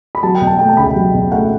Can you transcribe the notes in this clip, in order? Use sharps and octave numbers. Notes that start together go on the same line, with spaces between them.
B5
F#3 A5
G5
B2
A5
A3 G5
A5
C#2 B5
G5
F#3
B2
A3 F#5